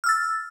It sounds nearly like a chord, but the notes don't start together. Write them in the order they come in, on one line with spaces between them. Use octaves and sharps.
F6 E6 A6